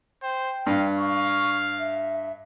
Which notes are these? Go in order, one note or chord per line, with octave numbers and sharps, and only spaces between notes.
C5 G5
G2 F5
F5 C#6
E5